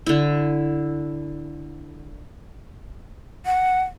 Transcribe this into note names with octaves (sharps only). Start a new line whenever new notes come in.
D3 E4
F#5